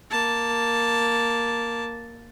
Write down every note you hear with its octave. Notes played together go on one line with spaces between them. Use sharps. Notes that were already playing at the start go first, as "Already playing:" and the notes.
A#3 A5